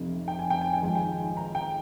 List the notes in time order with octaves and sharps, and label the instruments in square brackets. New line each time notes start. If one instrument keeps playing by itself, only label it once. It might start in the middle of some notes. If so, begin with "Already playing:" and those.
Already playing: [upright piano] F1 F2 C3
G5
G#5
G5
G#5
G5
G#1 G#2 F3 G#5
G5
A#5
G5